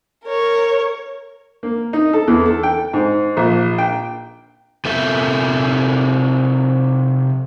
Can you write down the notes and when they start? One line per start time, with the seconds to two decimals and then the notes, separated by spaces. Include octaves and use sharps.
0.25 A#4 C#5
1.63 A#3
1.93 D#4
2.13 A4
2.28 E2
2.46 A4
2.63 G5
2.93 G#2
3.37 A#1
3.78 G5
4.85 C3 A4 A#4 E5